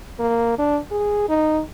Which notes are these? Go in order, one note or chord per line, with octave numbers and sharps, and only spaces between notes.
A#3
D4
G#4
D#4